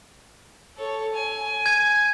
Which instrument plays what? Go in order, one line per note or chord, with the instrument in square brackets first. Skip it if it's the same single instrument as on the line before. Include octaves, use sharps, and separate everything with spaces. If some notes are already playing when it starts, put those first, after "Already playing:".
[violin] A4 C#5
G#5
[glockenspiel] G#6 D#7